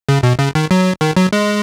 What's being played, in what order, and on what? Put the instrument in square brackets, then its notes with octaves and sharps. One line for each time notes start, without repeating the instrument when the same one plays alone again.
[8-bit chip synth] C#3
B2
C#3
D#3
F#3
D#3
F#3
G#3